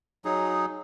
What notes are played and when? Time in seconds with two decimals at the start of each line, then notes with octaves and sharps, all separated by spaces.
0.25 F#3 D#4 G#4